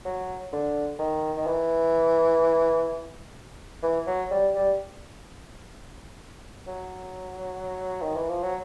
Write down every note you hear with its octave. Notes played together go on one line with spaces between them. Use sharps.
F#3
D3
D#3
D#3
E3
E3
F#3
G3
G3
F#3
D#3
E3
F3
F#3